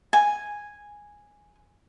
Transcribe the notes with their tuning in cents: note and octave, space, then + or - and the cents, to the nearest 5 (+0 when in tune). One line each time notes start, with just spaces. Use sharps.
G#5 -5